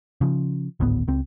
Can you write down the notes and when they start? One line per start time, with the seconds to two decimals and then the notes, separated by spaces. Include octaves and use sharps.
0.21 C#3 F3
0.80 G#1 D2 A2 B3
1.08 C#2 C4